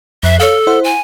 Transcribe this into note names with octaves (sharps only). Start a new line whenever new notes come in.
F2 E5 F#6 C7
A4 C#5 F5
E4 C5 F#5
G#5